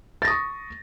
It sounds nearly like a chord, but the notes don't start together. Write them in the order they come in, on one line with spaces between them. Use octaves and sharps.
A6 A#6 D#6 C#6